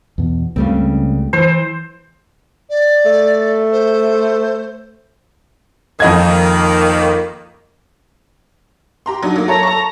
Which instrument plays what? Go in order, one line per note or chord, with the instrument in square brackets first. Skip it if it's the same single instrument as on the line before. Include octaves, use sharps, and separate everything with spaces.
[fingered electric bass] E2 B2
[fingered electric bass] C#2 A3 [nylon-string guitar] C#3 G3 C4
[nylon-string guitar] E3 [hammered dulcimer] C5
[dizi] D5
[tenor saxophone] A3
[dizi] C5
[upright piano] F2 D#5 G#6 [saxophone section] D#3 A#3
[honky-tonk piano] G4 A#5 C6
F#3 D4 D#4
F#3 A#3
[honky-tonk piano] A4 C#5 [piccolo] A#5
[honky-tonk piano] A4 A5 C#6